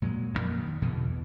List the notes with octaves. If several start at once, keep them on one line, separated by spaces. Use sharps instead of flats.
A#2 F#3 G#3
A1 F2 A#2
D#3
E2 B2 D3 E3